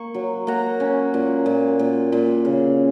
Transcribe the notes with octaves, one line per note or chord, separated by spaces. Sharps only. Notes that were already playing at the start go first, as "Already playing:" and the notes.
Already playing: A#3 C#6
F#3
A#3 F#5 A#5
C#4
A#2
A#2
A#2
A#2
C#3